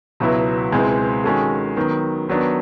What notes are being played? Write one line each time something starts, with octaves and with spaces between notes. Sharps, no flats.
C#2 B2 F#3 B3 E4
C#2 B2 G#3 C4 E4
D#3 G#3 C#4 F#4 A4
D#3 F#3 B3
D#3 F#3 B3 D4